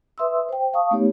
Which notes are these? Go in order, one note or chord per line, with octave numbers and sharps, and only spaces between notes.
B4 E5 C6 D#6 E6
C5 G5
F5 A5 C#6 D#6
A3 B3 D#4 G4 C#5